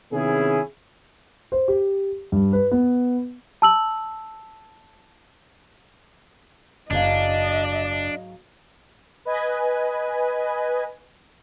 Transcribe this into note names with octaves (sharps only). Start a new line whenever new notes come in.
C3 D#3 B3 C#4 E4 G#4
C5
G4
G2
B4
B3
A5 E6 F#7
F#1 G#2 F#3 D4 D#5 F5
B4 D#5 G#5